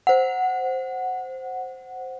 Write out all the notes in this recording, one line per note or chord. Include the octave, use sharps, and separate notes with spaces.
C5 F#5